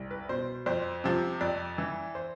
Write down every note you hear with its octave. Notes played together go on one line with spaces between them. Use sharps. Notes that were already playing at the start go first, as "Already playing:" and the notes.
Already playing: C2
B4
B2 C5
F2 C5
C3 F3
F2 D5
E3
C5